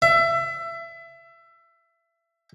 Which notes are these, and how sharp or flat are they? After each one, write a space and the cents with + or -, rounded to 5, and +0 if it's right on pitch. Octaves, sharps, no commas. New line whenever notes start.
E5 +25